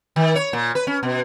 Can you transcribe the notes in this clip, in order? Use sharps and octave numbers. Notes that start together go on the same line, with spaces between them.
D#3
C#5
A#2
B4
C#4
B2